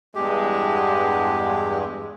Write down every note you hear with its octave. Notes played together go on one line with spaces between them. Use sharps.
E2 G2 G#3 G4